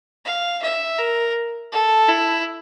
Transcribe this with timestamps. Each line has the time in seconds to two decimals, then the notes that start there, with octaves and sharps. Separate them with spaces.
0.25 F5
0.62 E5
0.98 A#4
1.72 A4
2.09 E4